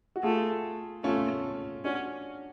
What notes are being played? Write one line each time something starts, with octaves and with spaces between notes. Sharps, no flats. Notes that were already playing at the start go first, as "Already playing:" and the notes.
F#4
A3 F4 G#4
A3 C#4 F4
C#4 D4 F#4